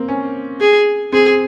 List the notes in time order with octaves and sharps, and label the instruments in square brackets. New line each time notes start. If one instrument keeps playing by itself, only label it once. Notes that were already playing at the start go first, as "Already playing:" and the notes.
Already playing: [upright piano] A#3 C4
C#4
[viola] G#4
[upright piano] C4 [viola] G#4